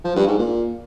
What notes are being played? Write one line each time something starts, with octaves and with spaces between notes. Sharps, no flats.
F3
G2
G#2
A#2